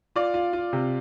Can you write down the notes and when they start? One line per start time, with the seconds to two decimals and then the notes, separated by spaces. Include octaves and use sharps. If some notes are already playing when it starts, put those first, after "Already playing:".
0.16 F4 D5
0.34 F4
0.53 F4
0.73 C3